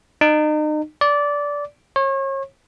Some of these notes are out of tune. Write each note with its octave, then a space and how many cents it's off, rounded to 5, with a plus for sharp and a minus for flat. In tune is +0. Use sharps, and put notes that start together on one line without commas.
D#4 -35
D5 -15
C#5 -35